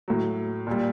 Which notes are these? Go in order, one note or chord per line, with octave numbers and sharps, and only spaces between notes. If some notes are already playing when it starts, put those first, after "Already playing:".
A2 F#3
A#2 G3